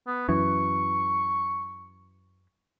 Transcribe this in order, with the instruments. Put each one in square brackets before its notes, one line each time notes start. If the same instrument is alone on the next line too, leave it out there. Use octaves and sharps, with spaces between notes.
[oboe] B3
[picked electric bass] F#2 E3 [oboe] C#6